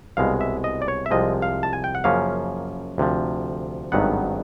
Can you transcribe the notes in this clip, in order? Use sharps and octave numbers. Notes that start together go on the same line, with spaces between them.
C2 B2 G#3 F5
E5
D#5
D5
C#5
E5
C2 C3 F3 G#3 D#5
F5
A5
G#5
G5
F#5
F#2 C#3 F3 A#3 C#4 F5
D2 C3 F3
G#1 G2 D#3 F#3 B3 F#5